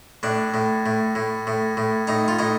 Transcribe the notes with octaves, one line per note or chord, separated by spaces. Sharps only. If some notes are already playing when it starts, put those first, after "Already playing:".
A2 D4
A2
A2
A2
A2
A2
A2 D#4
F4
A2 D#4